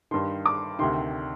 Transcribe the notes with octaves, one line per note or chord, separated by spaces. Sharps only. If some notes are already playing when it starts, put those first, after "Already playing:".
G2 D#3 C6
D6
D2 C3 D#3 C6